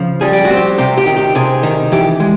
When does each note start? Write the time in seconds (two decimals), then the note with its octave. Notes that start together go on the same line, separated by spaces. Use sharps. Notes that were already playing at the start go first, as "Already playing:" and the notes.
Already playing: C#3 F3
0.21 G3 G#4
0.33 G4
0.45 F#4
0.50 C4
0.57 G4
0.78 C3 G4
0.98 G4
1.06 D#3
1.16 G4
1.35 C3 G#4
1.63 D#3
1.92 E3 G4
2.20 G#3